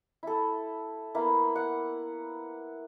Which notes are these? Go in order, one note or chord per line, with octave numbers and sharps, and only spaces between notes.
E4 A4
A#3 B3 E4
F#5